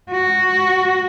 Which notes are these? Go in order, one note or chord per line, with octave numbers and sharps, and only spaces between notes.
F#4